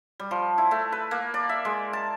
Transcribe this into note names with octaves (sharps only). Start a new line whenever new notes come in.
G3
F3
E4
A3
B4
A#3
D5
E5
G#3
A5